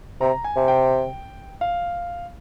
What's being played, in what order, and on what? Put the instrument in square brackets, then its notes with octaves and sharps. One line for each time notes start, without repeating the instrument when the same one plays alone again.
[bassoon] C3 [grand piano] A#5
[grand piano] G#5
[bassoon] C3
[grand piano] G5
F5